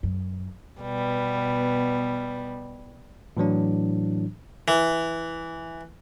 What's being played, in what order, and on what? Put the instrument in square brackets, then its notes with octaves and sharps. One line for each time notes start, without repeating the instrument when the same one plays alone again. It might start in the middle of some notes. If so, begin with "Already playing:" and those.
[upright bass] F#2
[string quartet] B2 G3 B3
[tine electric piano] A2 E3 F#3 D4
[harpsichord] E3